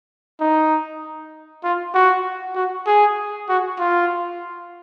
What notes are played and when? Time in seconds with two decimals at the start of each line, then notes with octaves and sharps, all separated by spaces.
0.40 D#4
1.64 F4
1.94 F#4
2.56 F#4
2.87 G#4
3.49 F#4
3.79 F4